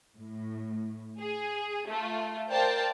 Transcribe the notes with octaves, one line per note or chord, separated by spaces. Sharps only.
A2
G#4
A3 F4
A#4 C5 D5 F5 G5 A5